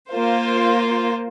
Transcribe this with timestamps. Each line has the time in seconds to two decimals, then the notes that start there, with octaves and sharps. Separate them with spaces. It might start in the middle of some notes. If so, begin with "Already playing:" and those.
0.11 A#3 F4 C5